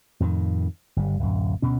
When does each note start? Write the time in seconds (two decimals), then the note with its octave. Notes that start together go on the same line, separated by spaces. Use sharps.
0.20 F2 A2 D3 D#3
0.97 G1 G3
1.20 D1 F#2
1.62 D2 B2 C#4